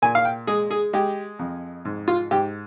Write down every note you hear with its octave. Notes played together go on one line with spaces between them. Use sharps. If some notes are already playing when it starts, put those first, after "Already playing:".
A#2 G#5
F5
G5
G#3 G#4
G#4
G#3 G4
F2
G#2
F4
G#2 G4